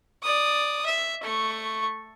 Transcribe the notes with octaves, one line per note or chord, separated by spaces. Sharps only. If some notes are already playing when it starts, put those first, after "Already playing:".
D5 D#6
E5
A3 C#6